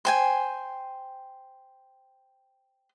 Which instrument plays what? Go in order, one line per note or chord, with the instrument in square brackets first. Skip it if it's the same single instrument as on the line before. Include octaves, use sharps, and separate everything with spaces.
[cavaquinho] C5 G5 G#5